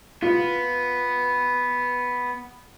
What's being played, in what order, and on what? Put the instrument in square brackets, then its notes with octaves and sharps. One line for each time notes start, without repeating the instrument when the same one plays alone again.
[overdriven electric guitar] B3 [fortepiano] F4